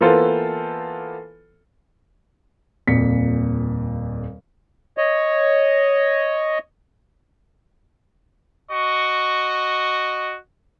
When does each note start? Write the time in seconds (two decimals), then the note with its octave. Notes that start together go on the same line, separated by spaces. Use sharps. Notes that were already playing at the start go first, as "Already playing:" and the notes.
0.01 E3 A#3 B3 F4 A4 C5
2.87 D#1 F2 A#2 B6 C#7
4.98 C#5 D#5
8.71 F#4 D#5 C#6